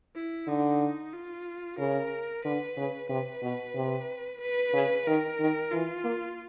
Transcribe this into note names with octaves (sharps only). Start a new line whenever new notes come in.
E4
D3 D#4
F4
C#3 A#4
D3 B4
C#3
C3 B4
B2
C3
B4
C#3
D#3 A#4
D#3
E3 F4
A#3